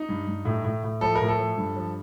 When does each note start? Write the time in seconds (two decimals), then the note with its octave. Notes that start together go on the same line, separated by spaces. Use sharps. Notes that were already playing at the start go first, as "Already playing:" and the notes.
Already playing: D#4
0.09 G2
0.27 G2
0.45 A2
0.64 A2
0.84 A2
1.01 F3 A4
1.15 A#4
1.21 A2
1.28 A4
1.39 F3
1.58 G2
1.76 F3